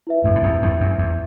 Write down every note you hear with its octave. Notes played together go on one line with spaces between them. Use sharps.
E4 B4 E5
F#2 A2
A2
E2 G2
E2 G2
F#2
E2